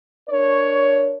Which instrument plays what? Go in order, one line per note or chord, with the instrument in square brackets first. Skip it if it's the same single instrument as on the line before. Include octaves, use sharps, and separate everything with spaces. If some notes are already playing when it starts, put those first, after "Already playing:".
[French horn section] D4 A#4 C#5